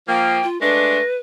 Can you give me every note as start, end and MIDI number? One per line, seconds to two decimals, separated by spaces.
0.08 0.41 53
0.08 0.41 58
0.08 0.47 79
0.43 0.60 65
0.61 0.99 56
0.61 0.99 57
0.61 0.99 62
0.61 1.17 71
0.61 1.05 94